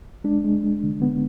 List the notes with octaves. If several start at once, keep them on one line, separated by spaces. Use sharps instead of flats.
G#3 D4
G#3
G#3
D3
D3 B3